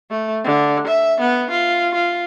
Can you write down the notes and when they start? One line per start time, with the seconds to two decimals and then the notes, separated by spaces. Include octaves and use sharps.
0.11 A3
0.44 D3
0.87 E5
1.20 B3
1.51 F4
1.95 F4